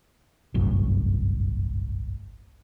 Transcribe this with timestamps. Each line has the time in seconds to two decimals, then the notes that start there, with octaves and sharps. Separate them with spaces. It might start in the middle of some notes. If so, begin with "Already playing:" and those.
0.54 G1 C2 F#2 A2